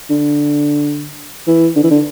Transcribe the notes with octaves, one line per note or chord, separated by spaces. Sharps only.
D3
E3
D3
E3
D3